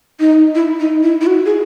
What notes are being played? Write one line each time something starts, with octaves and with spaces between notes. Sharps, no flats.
D#4
E4
D#4
E4
E4
F#4
G#4